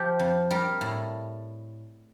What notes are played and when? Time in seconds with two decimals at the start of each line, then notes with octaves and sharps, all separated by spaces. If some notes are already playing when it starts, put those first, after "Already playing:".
Already playing: F3 G4
0.19 F2
0.51 G3 A#4
0.81 A2